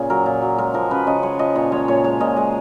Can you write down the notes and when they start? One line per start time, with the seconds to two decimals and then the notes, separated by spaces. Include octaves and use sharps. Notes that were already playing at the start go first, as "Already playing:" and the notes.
Already playing: A#2 C#3 G#4
0.10 F#3 A#4
0.26 A#2
0.42 F#3
0.59 G#3 A#4
0.74 F3 A#4
0.90 C#3 B4
1.07 C#3 D#5
1.23 G#3 C#5
1.39 F3 D#5
1.55 A#2 C#5
1.72 G#3 C#5
1.88 A#2 C#5
2.04 G#3 C#5
2.20 A#2 D#5
2.36 G#3 D#5